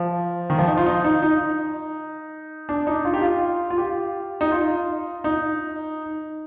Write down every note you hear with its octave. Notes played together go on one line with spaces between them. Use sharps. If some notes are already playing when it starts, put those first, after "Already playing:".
Already playing: F3
D#3
F3
D#4
F4
D#4
D#4
D#4
D4
D#4
F4
G4
F4
F4
G4
D#4
F4
D#4